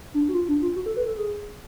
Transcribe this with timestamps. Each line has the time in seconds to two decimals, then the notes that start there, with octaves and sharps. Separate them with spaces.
0.14 D4
0.29 F#4
0.34 F4
0.49 D4
0.62 F4
0.76 F#4
0.86 A4
0.97 B4
1.06 A4
1.17 G#4